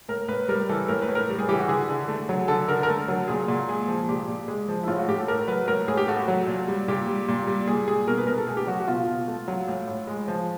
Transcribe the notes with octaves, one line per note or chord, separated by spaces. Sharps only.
A2 A#4
A2 B4
G3 A#4
E3 A4
A2 A#4
B4
A2
A#4
G3
G#4
E3 G4
F#4
D3 G#4
D3
A3
F#3
D3 A4
D3 A#4
A#4
A3 A4
F#3
A#2 G#4
A#2
G#3 G#4
F3
A#2 G4
A#2
G#3 G#4
F3
E4
A2 F4
F#4
A2 G4
A4
A3 A#4
F#3 B4
A2 A#4
A2 G#4
G4
A3 F#4
F#3
A#2
G3
A#2 G4
G3
A#2
G3
A#2 G#4
G3 G#4
B2 A#4
B4
B2 A#4
A4
A3 G#4
G4
F#3 F#4
F#4
B2 F4
B2
A3
F#3
A2
A2
G#3
F3